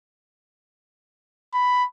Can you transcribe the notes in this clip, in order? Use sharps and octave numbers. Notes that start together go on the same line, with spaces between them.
B5